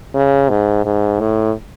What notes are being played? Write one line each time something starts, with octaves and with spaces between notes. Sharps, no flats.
C#3
G#2
G#2
A2